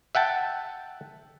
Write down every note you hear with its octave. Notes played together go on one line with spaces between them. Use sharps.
E5 F#5 G5 A5